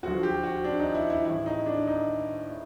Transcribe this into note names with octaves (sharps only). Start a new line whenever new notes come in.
D2 D3 F3 F#4
G4
F#4
D4
D#4
E4
E4
A1 A2 E3 E4
D#4
D4
D#4
A2